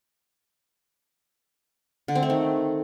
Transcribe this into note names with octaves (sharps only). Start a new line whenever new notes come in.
D3
C4
A3
D#3